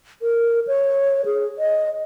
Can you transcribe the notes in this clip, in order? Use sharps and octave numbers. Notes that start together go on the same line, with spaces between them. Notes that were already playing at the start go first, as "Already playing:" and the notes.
A#4
C#5
G#4
D#5